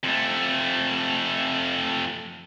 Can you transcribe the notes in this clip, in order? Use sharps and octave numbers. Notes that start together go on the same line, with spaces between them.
F2 A3